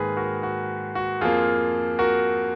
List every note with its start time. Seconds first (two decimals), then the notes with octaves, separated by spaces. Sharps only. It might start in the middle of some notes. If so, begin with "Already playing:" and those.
Already playing: G#2 D#3 A#3 G#4 B4
0.17 F#4 A#4
0.43 F#4
0.95 F#4
1.21 F2 F3 A#3 F4 G#4
1.99 F#4 A#4